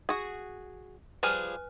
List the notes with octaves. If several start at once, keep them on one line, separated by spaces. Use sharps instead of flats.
F#4 G#4
F3 G3 G#4 B4 G#5 F6